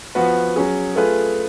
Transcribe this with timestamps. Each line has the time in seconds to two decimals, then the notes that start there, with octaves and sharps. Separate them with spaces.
0.15 F3 B3 F#4 B4
0.56 F#3 C#4 G#4
0.96 A3 F4 G#4 B4